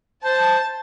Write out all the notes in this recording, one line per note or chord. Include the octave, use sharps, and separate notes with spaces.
C5 A5